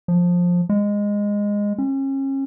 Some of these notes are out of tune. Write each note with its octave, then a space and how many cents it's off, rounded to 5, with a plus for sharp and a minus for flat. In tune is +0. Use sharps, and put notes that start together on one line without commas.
F3 +15
G#3 -15
C#4 -35